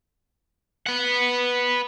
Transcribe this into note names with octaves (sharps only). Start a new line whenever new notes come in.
B4 F#5